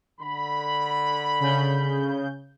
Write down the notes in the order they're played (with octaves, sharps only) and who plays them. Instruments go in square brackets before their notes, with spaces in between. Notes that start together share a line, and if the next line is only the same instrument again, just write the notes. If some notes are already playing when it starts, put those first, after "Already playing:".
[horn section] D3 B5
[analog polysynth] C#3 G6